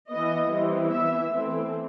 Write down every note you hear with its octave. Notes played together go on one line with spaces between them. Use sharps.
E3 B3 D#5
E3 G3 C4
E3 B3 E5
E3 A3 C4